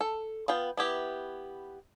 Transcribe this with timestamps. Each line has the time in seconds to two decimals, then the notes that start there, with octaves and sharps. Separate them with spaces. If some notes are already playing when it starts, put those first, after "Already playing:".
0.01 A4
0.48 B3 F4 G5
0.77 B3 E4 G4